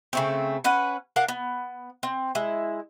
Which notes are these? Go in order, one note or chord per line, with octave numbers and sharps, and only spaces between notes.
C#3 A3 C4
C#4 B4 F#5
D4 A#4 F5 F#5
B3
C4
G#3 E4